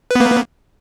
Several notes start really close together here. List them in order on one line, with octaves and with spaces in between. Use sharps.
B4 B3 A#3